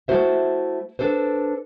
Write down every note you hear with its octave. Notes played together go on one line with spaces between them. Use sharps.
A3 E4 F#4 C5 E5
D4 A4 B4 C5